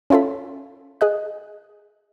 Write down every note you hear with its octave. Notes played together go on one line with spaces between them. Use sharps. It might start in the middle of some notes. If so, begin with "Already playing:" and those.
C#4 E4 F4 A4 B5
G#4 D#5 F#6